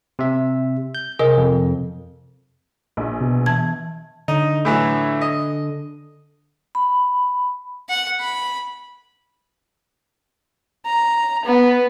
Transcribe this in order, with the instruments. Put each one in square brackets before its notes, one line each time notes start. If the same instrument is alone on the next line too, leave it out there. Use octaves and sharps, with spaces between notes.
[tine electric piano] C3 E5
G6
[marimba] C3 A#4 D#5 [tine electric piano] G#4
[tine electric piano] F2
[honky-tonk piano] A#1
[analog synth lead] B2
[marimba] E3 A5 G#6
[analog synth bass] D3 [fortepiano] D#4
[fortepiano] A2 E3 F#3
D#5
[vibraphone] B5
[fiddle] F#5
B5
[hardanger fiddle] A#5
B3